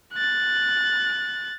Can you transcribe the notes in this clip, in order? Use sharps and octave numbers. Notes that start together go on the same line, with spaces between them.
F#6 A6